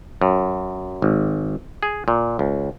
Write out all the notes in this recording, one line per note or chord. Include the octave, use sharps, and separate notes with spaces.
F#2
G#1
G#4
A#2
C#2